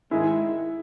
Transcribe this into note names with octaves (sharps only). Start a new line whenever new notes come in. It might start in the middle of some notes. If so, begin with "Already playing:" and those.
G#2 D#3 G#3 E4